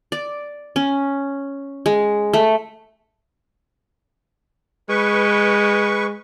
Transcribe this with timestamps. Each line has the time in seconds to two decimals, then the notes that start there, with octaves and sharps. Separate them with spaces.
0.12 D5
0.76 C#4
1.86 G#3
2.33 A3
4.89 G#3 B4 C#6